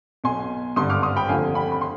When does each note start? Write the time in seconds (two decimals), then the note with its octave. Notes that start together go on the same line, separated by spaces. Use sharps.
0.24 B1 B2 G#5 C6
0.76 G#1 G2 D3 C6 D#6
0.90 D6 F6
1.02 C6 D#6
1.16 G5 B5
1.29 F1 D#2 D3 F3 F5 G#5
1.55 G5 B5
1.72 B5
1.81 C6